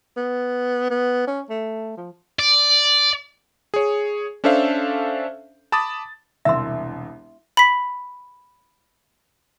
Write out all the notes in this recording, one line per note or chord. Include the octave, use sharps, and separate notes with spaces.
B3
B3
C#4
A3
F3
D5
G#4 C#5
C#4 D4 A4 C5 E5 F5
A5 B5 D6 D#6 A6
E1 C2 E5 C6 E6
B5 B6